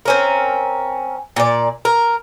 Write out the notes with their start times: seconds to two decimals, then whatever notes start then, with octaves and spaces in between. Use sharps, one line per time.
0.06 C4 C#4 A#4
1.36 A#2 D5
1.85 A#4